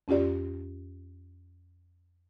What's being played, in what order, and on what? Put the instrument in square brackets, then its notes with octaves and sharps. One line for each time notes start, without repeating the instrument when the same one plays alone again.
[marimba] F2 C#4 F4 G4 D5